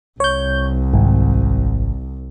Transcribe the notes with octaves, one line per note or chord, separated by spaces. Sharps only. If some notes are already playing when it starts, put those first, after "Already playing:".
C2 C#5 G6
G#1